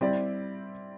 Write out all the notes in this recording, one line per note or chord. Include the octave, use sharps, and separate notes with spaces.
G3 C4 E4 G4 D5